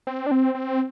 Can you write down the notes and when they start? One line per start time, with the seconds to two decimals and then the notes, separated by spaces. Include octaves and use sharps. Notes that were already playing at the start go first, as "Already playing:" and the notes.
0.07 C4
0.26 D4
0.31 C4
0.55 C4